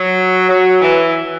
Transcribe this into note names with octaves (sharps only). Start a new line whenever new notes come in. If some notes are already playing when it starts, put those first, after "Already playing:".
Already playing: F#3
F#3
E3